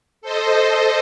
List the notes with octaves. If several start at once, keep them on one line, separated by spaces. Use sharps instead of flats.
A4 C5 D#5